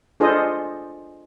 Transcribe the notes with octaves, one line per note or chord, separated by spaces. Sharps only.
D4 F4 G#4 A4 C5 D#5